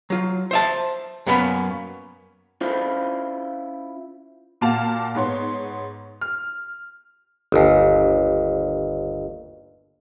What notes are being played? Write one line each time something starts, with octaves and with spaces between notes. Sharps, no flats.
F#3 F4
C5 E5 A5
F#2 A#3 B3 C#4 B5
C#4 E4 F4 C5
A#2 A#3 F#4 F5 A5 F7
G#2 B3 C#5 C6
F6
G1 D#2